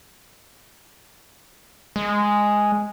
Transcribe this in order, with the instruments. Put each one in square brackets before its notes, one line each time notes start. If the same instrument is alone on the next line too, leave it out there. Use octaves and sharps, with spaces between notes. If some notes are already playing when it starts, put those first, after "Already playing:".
[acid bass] G#3